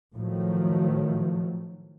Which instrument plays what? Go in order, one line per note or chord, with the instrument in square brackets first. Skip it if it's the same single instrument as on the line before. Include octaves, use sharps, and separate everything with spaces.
[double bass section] A2 D#3 F3 F#3 A3